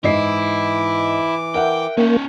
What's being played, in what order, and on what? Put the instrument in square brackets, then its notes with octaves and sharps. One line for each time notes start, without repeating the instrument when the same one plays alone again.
[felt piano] G#2 D#5 C7 [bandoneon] E3 D6 [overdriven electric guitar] E4
[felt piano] A#4 E5 F#5 [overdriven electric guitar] G5
[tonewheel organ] A#3 [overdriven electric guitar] C#4 D#4